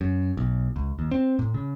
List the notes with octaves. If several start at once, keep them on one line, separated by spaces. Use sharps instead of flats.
F#2
B1
C#2
D#2
C4
A2
C#3